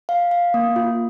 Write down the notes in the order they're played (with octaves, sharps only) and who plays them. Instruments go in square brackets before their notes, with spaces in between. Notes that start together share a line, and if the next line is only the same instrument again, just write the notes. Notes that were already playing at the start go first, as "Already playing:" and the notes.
[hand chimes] F5
F5
A#3
F4